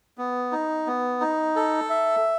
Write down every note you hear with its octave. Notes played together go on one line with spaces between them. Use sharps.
B3
D#4
B3
D#4
A4
E5